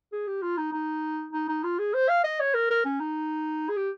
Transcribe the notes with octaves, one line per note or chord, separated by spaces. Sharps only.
G#4
G4
F4
D#4
D#4
D#4
D#4
F4
G#4
C5
F5
D#5
C#5
A#4
A#4
C#4
D#4
G#4
G4